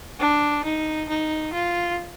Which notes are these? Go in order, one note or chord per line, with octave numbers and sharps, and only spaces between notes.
D4
D#4
D#4
F4